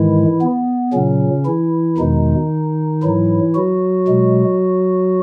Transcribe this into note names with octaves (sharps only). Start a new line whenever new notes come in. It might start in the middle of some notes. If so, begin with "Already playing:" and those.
Already playing: G#2 D#3 E3 G#3 E4
B3
A#2 C#3 F#3 C#4
E3 E4
E2 B2 D#3 G#3 D#4
G#2 E3 F#3 E4
F#3 F#4
B2 G#3